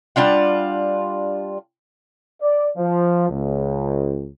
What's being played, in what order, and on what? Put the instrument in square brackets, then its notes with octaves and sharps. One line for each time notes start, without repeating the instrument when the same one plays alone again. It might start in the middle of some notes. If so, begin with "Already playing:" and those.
[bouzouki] G3 D4 F4 F#5
[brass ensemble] D5
F3
C#2